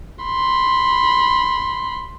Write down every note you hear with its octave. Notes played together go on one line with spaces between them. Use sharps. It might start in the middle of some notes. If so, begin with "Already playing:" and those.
B5 C6